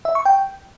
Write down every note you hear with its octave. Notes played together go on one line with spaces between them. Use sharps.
E5
C#6
G5